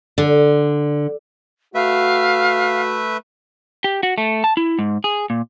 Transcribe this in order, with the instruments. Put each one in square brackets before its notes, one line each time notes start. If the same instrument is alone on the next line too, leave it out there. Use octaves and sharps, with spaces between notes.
[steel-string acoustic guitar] D3
[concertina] A3 B4 E5 [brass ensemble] F#4 [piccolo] F5
[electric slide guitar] G4
F#4
A3
A5
E4
G#2
G#4
A#2